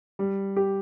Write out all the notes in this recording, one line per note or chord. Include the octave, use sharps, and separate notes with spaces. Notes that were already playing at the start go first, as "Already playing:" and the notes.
G3
G4